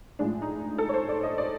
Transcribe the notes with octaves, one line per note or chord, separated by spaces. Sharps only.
A2 F3 G#3 D4
D#4
A4
C#5
C5
D5
D#5
D5